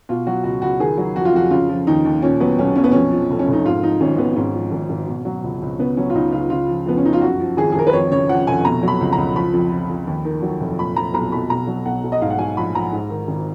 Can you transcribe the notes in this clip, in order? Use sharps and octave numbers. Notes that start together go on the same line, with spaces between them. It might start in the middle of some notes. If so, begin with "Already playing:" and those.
B2 F4
F#3 F#4
C#2 F#4
C#2 F#4
D#3 G#4
F#3
F2 F#4
F4
F2 F#4
C#3 F4
F3
D#2 D#4
D#2
A#2 C#4
F#3 B3
B1 C#4
B1 C#4
B3
F2 C#4
F3
F1
C#4
F1
D#4
G#2 F4
F3 D#4
G#1 C#4
G#1 B3
G#2 C#4
F3
G#1
G#1
B2
F#3
C#2
C#2
C#3 B3
F#3 C#4
F4
C#2 D#4
C#2 F4
C#3 F4
F3
F2 B3
C#4
F2 D#4
F4
F#2 F#4
F3
G#1 G#4
G#4
G#1 A#4
B4
F2 C#5
C#3 C#5
F3 F#5
F1 G#5
B2 A#5
F#3 B5
C#2
A#5
C#2
F3 B5
F2
F3
F2
D#2
D#3
F#3
F1
A#2 B5
F3 A#5
B1 A#5
B1 B5
B2 A#5
F#3
B1 F#5
B1
D#5
G#2 F5
F#5
F#3 G#5
A#1 B5
A#1 A#5
G#2
D#3
G#1